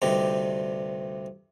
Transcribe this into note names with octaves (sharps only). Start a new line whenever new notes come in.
D2 G2 C3 D#4 G4